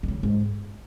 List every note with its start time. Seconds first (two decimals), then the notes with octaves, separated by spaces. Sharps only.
0.03 D#3
0.08 C#3
0.23 G#2